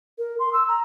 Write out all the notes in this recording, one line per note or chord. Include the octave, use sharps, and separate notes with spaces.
A#4
C6
E6
A#5